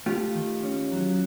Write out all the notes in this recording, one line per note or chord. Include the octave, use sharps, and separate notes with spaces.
A3 F4 G4
D#3
C#4
F#3